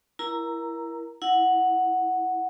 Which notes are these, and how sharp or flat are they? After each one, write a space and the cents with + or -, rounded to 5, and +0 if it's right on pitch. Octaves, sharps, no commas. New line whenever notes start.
E4 +15 A#4 +20 A#5 +0
E4 +0 F#5 +0